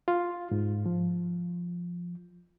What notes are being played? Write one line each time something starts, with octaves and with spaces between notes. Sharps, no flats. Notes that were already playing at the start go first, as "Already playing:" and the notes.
F4
G#2
F3